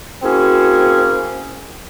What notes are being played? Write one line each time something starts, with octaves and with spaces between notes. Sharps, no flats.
A#3 C4 C#4 E4 F#4 G#4